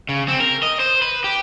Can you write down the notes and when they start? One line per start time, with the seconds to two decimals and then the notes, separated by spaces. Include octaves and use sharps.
0.09 C#3
0.28 C4
0.40 A#4
0.63 D#5
0.80 C5
1.02 B4
1.24 G4